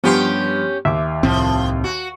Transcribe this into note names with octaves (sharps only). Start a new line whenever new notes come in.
G2 F3 B3 C#4 G4 C6
D#2 E5 D6
C2 A2 F3 C4
F#4